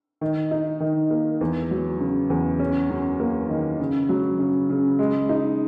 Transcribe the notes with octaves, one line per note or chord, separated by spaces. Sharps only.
D#3
D#4
D#3
A#3
E2
F#3
C#3
E2
C#4
F#2
A#3
D#3
C#3
F#3
C#3
C#3
G#3
D#4